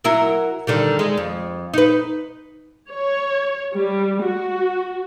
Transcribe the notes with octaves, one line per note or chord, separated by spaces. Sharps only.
F#3 E4 A#4
D3 D#3 G3
G#3
F2
D#4 B4
C#5
G3
F#4